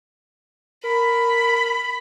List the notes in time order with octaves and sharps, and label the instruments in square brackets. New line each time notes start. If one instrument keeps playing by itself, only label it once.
[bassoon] A#4 [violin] B5